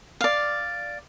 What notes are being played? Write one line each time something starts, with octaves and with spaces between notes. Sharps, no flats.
D5 F5